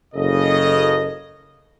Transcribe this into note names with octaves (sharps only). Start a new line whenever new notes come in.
F#1 C#3 A4 D#5